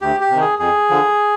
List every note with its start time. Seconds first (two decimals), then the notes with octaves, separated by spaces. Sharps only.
0.01 D2 G4
0.20 G4
0.30 C3 D#3
0.40 G#4
0.59 F2 G#4
0.89 D3 F3